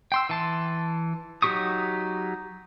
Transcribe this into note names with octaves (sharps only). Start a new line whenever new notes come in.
G5 C6 E6
E3 A5 C6
F#3 D#4 G4 C#6 D#6